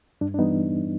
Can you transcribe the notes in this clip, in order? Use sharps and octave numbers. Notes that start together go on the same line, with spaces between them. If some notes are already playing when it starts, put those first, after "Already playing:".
G2 D4
D4
E3 G3 B3 D#4